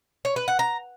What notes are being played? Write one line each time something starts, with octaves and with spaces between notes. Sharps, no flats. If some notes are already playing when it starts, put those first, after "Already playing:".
C#5
B4
F#5
A#5